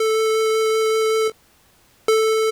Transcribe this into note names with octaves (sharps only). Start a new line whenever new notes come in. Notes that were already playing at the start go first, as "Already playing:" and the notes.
Already playing: A4
A4